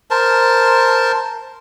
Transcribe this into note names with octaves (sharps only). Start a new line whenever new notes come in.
A#4 C5 A5